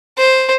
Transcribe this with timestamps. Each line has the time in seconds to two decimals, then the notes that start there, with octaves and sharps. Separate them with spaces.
0.18 C5